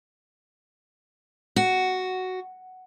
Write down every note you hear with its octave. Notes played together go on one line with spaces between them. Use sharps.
F#4